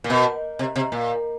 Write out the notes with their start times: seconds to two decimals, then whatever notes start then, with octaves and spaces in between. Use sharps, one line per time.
0.04 A#2
0.10 B2
0.59 C3
0.76 C3
0.92 A#2